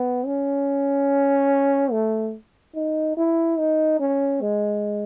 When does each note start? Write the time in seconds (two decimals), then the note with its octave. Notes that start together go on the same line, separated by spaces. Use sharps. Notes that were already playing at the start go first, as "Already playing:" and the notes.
Already playing: B3
0.26 C#4
1.92 A3
2.75 D#4
3.17 E4
3.58 D#4
4.00 C#4
4.41 G#3